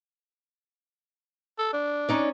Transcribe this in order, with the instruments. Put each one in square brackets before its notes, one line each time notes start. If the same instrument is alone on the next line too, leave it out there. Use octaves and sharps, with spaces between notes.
[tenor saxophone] A4
D4
[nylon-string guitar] C#4 D#4 D5